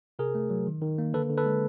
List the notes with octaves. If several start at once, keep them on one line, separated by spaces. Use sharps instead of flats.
C3 G#4 A#4
A3
F#3
D#3
D#3
A#3
D3 A4 B4
D3
A4 B4
G#3